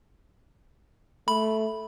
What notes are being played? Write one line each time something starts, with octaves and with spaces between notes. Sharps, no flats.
A3 B5